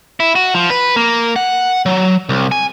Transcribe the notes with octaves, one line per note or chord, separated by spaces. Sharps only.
E4
F#4
F3
B4
A#3
F#5
F#3
C2
G#5